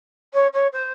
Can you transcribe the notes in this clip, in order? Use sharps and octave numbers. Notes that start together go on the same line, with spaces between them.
C#5
C#5
C5